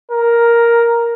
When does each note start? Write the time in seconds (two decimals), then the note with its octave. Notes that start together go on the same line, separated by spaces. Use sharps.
0.11 A#4